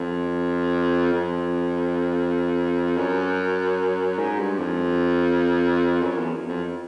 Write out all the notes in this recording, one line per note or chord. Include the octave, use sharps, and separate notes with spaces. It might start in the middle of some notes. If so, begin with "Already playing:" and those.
Already playing: F2
F2
F#2
G#2
G2
F2
F#2
E2
F2